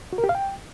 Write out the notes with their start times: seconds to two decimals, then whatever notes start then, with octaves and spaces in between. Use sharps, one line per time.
0.13 F#4
0.18 A#4
0.24 G4
0.29 F5
0.35 G5